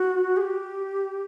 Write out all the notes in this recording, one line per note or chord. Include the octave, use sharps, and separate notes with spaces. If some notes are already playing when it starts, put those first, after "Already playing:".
Already playing: F#4
G#4
G4